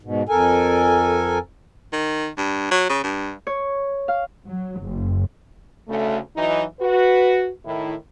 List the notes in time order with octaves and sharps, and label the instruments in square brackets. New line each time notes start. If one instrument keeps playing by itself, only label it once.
[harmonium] G#2 B2
F2 A4 A#4 G#5
[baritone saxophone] D#3
G2
F#3
C#3
G2
[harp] C#5
F5
[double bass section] F#3
F#1
[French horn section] D2 C#3 A3
E3 F#3 D#4
F#4 B4
A2 D#3 E4